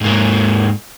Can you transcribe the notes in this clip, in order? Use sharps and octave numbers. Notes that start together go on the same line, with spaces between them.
G#2 A#3